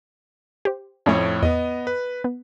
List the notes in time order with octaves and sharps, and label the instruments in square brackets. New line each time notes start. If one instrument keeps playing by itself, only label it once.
[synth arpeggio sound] G4 C5
[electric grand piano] F2 A2 C#5 [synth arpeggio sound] A3 C#4 D4
[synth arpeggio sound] E2 [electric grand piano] B3 D#5
[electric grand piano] B4
[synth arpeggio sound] B3